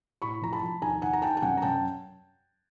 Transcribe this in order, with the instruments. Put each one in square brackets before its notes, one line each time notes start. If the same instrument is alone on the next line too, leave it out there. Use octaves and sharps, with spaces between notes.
[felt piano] A2 B5 C#6
F3 A#5
A5 B5
F3
D#2 G#5 A#5
D#2 F#5 G#5
A#5
D#3 G5 A5
G5
F#2 F#5 G#5
A#5
F#2 G5 A5